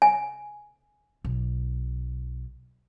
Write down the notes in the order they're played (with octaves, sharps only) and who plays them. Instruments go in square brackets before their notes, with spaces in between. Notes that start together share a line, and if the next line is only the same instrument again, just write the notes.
[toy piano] G#5
[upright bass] B1